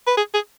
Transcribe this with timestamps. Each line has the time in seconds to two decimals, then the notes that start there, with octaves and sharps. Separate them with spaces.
0.07 B4
0.17 G#4
0.34 G#4